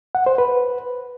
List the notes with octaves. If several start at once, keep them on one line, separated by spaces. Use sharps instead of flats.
F#5
C5
B4